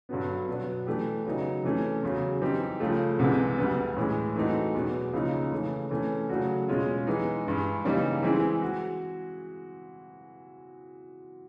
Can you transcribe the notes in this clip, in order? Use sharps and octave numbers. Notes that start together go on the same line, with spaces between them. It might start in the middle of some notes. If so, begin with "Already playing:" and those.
G2 D3 F#3 B3
B2 F#3 B3 D4
E3 A3 D4 G4
C#3 F#3 B3 D#4
C3 E3 A3 C#4
E2 C#3 F#3
E3 G3 C4 D#4 G4
C#2 C#3 F3 A3
C2 C3 E3 G#3 B3
D2 D3 G3 B3
A2 E3 G#3
E3 A3 C4 D#4 F#4
E2 B2 F#3 B3
C#2 C#3 F3 A#3 D#4
C#3 E3 A3
C3 E3 A3 C#4
C#3 F#3 A3 D4 F#4
E2 B2 G#3 C#4 F4
E3 G#3 B3 D#4
G2 E3 G#3
C#3 E3 G3 A#3 D#4
E3 G#3 C4 E4 G#4
F#4